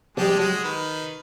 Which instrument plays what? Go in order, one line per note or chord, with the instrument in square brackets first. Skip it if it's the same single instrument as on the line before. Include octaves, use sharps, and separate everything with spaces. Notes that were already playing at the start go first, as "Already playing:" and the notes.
[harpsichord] A#1 G3 [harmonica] G#3 G4 A5
[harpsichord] F#3 [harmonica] G#3 F#4 G#4
[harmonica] D#3 B4